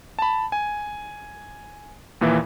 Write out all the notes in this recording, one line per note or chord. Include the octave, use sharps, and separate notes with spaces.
A5 B5
G#5
D#2 A#2 E3 E5